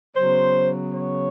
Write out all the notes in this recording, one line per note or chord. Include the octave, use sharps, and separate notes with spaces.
C#3 F#3 B3 C5
C#5